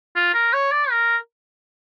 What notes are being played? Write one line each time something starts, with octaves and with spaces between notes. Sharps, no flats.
F4
A#4
C#5
D5
A#4